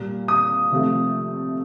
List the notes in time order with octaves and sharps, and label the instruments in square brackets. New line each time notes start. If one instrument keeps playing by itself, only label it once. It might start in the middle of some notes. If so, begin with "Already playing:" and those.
Already playing: [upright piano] A#2 G3 A#3
D#6
C3 F3 A3